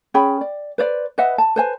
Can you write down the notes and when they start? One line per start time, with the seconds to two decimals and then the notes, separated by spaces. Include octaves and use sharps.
0.14 C#4 G#4 G5 B5
0.41 D5
0.78 B4 C5 D5
1.18 B4 D#5 E5 F#5
1.38 A5
1.56 B4 C5 G#5